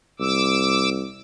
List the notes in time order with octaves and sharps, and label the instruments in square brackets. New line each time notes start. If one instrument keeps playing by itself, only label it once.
[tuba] C2 [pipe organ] D6 E6